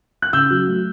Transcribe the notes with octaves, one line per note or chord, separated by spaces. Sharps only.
F#6
C#3 E6 G6
F#3
A3